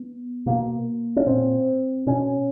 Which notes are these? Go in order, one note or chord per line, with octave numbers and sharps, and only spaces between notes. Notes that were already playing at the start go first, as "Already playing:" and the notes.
Already playing: B3
B2 A#3
C#4
A#2 C4
B2 C#4